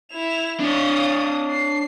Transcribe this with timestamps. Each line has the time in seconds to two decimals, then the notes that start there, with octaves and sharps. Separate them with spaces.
0.11 E4 F7
0.60 D4 C#5 F5 D#6
1.51 C7